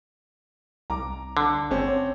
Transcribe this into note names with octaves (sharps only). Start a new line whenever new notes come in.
C2 A#5 D6
D3
G1 C4 C#4